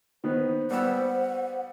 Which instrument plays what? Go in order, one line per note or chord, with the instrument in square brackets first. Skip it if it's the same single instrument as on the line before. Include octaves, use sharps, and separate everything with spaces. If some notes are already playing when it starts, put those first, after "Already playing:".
[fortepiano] D#3 B3 [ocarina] C5
[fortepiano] G3 B3 E6 [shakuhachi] F#5